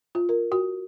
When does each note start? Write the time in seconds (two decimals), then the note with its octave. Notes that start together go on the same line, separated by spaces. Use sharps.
0.15 F4
0.29 A#4
0.52 F#4